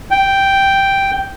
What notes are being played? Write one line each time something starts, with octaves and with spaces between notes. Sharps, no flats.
G5